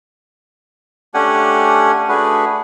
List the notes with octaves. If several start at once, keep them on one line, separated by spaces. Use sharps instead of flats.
A3 C#4 D4 G4 F#5 G#5
A3 D4 F#4 G#4 B4